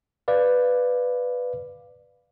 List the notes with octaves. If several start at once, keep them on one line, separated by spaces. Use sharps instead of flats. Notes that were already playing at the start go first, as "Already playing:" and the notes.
B4 D5 F5